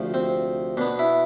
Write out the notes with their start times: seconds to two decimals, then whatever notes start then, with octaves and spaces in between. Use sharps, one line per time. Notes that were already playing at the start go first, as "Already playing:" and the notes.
Already playing: D2 C3 F3
0.14 C4
0.77 B2 B3 D4
0.99 E4